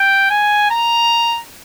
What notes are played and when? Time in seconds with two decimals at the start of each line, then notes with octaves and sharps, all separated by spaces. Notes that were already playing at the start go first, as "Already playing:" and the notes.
Already playing: G5
0.30 G#5
0.71 A#5